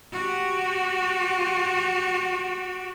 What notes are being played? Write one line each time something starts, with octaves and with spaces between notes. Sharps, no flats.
F#4 G4